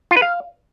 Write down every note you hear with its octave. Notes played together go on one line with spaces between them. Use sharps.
F4
B4
F5